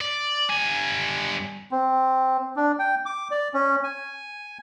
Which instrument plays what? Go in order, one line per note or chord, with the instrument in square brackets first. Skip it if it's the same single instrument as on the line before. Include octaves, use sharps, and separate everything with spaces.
[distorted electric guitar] D5
G2 G#5
[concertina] C4
D4
G5
D6
D5
C#4
G#5